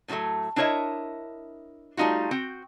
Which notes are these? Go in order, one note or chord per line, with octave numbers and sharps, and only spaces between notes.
A2 C#3 F3 F#3 A3
D4 E4 A#4 C#5 D#5 E5
G3 A3 D#4 F4 F#4
C4 F#4 G5